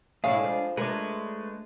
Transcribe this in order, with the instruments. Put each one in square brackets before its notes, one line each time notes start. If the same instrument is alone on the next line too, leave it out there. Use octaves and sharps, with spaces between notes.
[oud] A2 E4 [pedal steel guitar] G#3 D4 G#4 [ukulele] F5
[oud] F3
[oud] G#3 D4 [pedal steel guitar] A3 B4 [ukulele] A#4